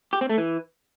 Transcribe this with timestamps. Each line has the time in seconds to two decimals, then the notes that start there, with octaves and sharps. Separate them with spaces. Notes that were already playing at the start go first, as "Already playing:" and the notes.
0.13 G4
0.21 C4
0.30 A3
0.38 E3